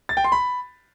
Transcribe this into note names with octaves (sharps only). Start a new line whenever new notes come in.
A6
G5
C6
B5